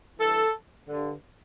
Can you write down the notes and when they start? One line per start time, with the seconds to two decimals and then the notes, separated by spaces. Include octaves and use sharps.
0.19 G2 E3 A4
0.88 G2 D3